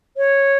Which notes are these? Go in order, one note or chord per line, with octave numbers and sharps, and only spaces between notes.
C#5